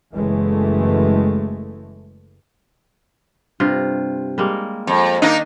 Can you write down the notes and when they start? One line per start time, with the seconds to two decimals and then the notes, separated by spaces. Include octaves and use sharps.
0.14 F#1 E3 G#3 A3
3.60 G2 C3 F4
4.38 G3 G#3 A#3
4.87 F2
5.22 D#3 A#3 D4 D#4 D#5